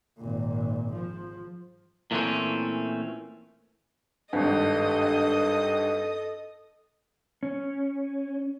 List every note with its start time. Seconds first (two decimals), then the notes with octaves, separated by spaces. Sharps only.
0.18 G#1 A#2
0.93 F3
2.11 A#2 E3 A3 A#3 C4 C#4
4.33 G#1 G2 A4 D#5 D#6
7.43 C#4